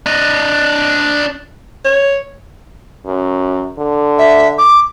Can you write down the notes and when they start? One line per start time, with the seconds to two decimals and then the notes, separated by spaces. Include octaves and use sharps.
0.06 D4 D#5
1.85 C#5
3.06 F#2
3.78 D3
4.18 E5
4.58 D6